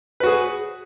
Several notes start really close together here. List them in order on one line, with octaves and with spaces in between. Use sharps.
B4 F#4 G#4